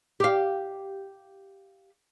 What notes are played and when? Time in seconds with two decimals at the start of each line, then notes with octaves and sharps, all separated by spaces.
0.20 G4 F5